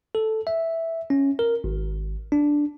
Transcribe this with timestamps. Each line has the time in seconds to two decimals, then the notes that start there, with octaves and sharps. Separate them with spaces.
0.15 A4
0.47 E5
1.10 C#4
1.39 A#4
1.64 G#1
2.32 D4